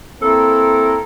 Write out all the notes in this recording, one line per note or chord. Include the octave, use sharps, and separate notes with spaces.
A#3 C4 E4 A4 A#4